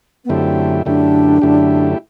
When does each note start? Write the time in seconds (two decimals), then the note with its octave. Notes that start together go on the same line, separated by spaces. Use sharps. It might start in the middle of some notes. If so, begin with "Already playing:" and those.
0.24 B3
0.29 F#2 D3 A3 C4 E4 G4
0.85 F#2 D3 A3 D4 E4 G4
1.42 F#2 D3 A3 E4 G4